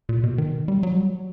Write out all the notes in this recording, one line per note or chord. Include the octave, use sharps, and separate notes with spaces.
A#2
B2
D#3
G3
F#3
G3
F#3